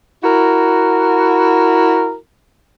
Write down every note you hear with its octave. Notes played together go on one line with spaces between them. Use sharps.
E4 F#4 A#4